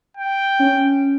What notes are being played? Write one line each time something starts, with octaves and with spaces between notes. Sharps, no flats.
G5
C#4